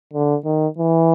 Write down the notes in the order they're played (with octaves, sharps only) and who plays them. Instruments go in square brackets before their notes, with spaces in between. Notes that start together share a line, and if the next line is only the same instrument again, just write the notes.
[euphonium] D3
D#3
E3